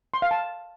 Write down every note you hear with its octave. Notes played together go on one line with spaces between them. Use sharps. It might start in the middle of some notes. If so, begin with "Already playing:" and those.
C6
F5
A5